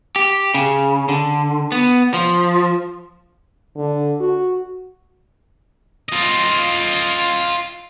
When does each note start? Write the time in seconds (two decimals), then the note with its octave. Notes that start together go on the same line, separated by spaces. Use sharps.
0.16 G4
0.54 C#3
1.09 D3
1.72 B3
2.14 F3
3.76 D3
4.20 F#4
6.09 F4 D#5